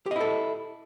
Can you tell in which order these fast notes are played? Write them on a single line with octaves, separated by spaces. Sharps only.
G4 D#5 E4 A4